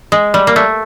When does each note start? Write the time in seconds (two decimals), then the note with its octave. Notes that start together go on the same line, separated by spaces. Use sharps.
0.12 G#3
0.34 G3
0.47 A#3
0.56 A3